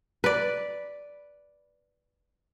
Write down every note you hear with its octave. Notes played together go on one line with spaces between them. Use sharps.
B4 D5